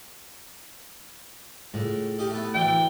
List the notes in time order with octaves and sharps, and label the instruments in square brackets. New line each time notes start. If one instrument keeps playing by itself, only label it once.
[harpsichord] C#2 [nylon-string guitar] A2
[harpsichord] D#4 G4 A#4
A3 B3
[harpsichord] D2 D3 E3 [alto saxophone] G5